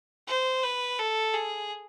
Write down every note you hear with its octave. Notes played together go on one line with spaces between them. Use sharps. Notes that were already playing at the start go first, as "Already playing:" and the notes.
C5
B4
A4
G#4